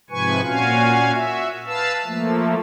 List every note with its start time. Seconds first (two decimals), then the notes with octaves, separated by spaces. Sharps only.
0.10 G#2 C3 F3 B4 G#5 C#6
0.45 A#2 C#4 F#4 F5 G#5
1.13 F#4 E5
1.67 B4 F5 A5 E6
2.05 F3 A3 A#3